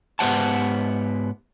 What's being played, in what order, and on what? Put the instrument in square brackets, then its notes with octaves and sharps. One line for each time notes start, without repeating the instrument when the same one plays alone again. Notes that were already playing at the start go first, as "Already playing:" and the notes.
[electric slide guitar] G#2 B3 G4 C5 F#5 A5